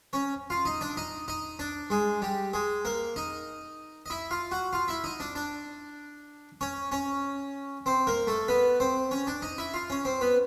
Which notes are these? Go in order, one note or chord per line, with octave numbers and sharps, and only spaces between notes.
C#4 C#5
F4 F5
D#4 D#5
D4 D5
D#4 D#5
D#4 D#5
D4 D5
G#3 G#4
G3 G4
G#3 G#4
A#3 A#4
D#4 D#5
D#5
E4 E5
F4 F5
F#4 F#5
F4 F5
E4 E5
D#4 D#5
D4 D5
D4 D5
C#4 C#5
C#4 C#5
C4 C5
A#3 A#4
A3 A4
B3 B4
C4 C5
C#4 C#5
D4 D5
D#4 D#5
E4 E5
F4 F5
C#4 C#5
C4 C5
B3 B4